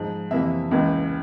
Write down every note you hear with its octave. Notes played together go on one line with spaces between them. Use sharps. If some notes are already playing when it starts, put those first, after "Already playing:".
Already playing: G#2 F3 G#3
F2 C3 E3 A#3 E5
C#2 C#3 E3 A#3